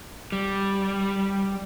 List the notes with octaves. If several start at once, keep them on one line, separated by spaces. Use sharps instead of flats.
G3